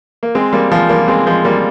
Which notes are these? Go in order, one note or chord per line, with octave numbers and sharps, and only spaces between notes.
A#3
G#3 C4
G3 A#3
F3 G#3
G3 A#3
G#3 C4
F3 G#3
G3 A#3